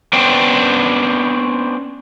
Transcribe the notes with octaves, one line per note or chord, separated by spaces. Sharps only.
B3 C#4 D4 C5 G5